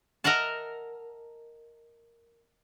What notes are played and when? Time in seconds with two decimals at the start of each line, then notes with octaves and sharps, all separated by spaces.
0.24 A#4 D#5 E5 F#5 A5